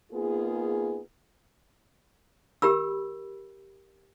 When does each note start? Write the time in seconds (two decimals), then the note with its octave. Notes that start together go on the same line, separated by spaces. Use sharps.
0.13 A#3 B3 D#4 F4 G#4
2.62 G4 A#4 B5 E6